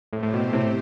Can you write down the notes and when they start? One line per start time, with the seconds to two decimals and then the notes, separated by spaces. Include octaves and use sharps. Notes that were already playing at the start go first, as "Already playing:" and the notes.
0.13 A2 A3 C4 G4 C5
0.23 A2
0.34 B2
0.53 A2 C3